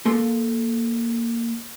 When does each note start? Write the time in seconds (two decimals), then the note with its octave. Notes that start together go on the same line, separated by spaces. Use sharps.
0.05 A#3 A4 C6